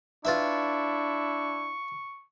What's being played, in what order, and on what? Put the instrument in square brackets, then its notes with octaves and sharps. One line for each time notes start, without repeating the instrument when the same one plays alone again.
[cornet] D4 [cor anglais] E4 [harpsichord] F4 B4 E5 [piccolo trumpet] C#6